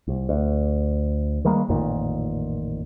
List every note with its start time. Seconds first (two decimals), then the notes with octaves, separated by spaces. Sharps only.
0.08 C2
0.29 D2
1.45 D#3 G3 G#3 A#3
1.69 A1 F2 A#2 D#3